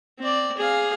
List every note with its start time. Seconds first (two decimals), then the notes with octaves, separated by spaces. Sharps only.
0.19 C4 D5
0.57 G#4 F5